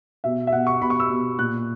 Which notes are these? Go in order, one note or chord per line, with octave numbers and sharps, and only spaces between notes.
B2 E5
E5
B2 F#5
C#6
B2 B5
C#6
E6
B2
A#2 F#6